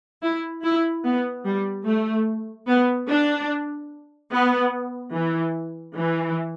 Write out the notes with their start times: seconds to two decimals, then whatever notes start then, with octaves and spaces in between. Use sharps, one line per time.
0.22 E4
0.63 E4
1.04 B3
1.44 G3
1.86 A3
2.67 B3
3.09 D4
4.32 B3
5.13 E3
5.95 E3